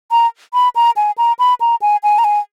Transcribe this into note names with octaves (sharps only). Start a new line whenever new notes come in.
A#5
B5
A#5
G#5
A#5
B5
A#5
G#5
G#5
A#5
G#5